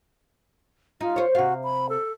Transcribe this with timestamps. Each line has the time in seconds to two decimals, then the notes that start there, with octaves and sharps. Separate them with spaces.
1.01 D#4 F4
1.16 C5 C#5
1.35 C3 F#4 F5
1.63 B5
1.89 A4